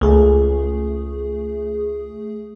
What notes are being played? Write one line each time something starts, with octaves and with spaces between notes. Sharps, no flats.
C#2 A3 G#4